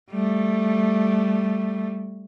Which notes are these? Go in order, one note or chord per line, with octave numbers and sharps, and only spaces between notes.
G3 A3